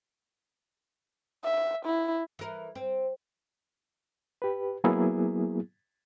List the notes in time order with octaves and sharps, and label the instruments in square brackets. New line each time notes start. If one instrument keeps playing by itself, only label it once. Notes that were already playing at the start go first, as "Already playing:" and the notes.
[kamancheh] E5
E4
[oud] E3 A#4
C4
[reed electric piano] G4 B4
F#3 A#3 B3 E4 G#4